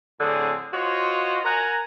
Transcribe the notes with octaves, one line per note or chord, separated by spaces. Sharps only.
A2 D3 F#3 C4 G#4
F4 F#4 C5 C#5 D#5
A#4 F#5 G#5 A#5